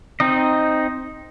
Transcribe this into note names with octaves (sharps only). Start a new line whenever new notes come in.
C4 D#4 D#5